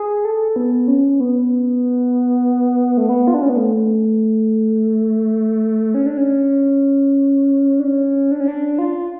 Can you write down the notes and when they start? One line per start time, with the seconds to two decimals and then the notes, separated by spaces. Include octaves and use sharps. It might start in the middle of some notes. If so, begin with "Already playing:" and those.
Already playing: G#4
0.25 A4
0.56 B3
0.88 C#4
1.20 B3
2.97 A3
3.09 B3
3.27 F4
3.34 D4
3.42 C#4
3.49 B3
3.57 A3
5.94 C#4
6.06 D4
6.17 C#4
7.80 D4
7.84 C#4
8.32 D4
8.40 C#4
8.48 D4
8.79 F4